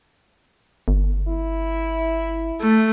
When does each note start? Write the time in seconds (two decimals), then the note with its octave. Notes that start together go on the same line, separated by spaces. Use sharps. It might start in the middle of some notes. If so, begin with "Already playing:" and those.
0.88 G1
1.28 E4
2.61 A3